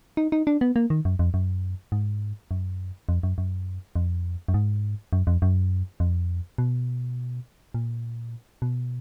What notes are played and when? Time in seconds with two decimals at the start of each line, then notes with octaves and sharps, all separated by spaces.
0.17 D#4
0.32 D#4
0.47 D4
0.61 B3
0.76 A#3
0.90 D#3
1.05 F#2
1.19 F2
1.34 F#2
1.92 G#2
2.51 F#2
3.09 F2
3.23 F#2
3.38 F#2
3.96 F2
4.48 F#2
4.54 G#2
5.13 F#2
5.27 F2
5.42 F#2
6.00 F2
6.58 B2
7.74 A#2
8.62 B2